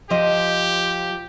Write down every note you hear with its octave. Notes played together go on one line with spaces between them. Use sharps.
F3 G4 C5 D#5